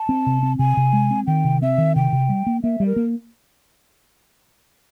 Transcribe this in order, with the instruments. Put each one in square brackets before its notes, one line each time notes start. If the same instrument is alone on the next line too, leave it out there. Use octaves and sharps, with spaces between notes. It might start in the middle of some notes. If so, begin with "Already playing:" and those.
Already playing: [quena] A5
[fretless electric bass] C4
C3
C4
[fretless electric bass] C3 [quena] G#5
[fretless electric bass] C3
G#3
C4
[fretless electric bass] D#3 [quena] G5
[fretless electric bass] C3
[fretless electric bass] C4 [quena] E5
[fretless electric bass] D#3
[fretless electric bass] C3 [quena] G5
[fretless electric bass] C3
G3
A#3
[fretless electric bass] A#3 [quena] E5
[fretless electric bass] G3
[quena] A#4
[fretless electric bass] A#3